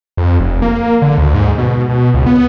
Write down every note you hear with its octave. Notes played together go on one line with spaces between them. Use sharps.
F2
F1
A#3
D3
D2
G#2
B2
B2
C#2
B3